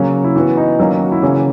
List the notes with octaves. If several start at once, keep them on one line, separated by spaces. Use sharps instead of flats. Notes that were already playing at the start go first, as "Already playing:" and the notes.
Already playing: C#3 F#3 A#3 C#4
E4
E3 B3 F#4
D#4
D#3 F#3 A#3 C#4
F#4
E4
C#3 E3 A#3 C#4 F#4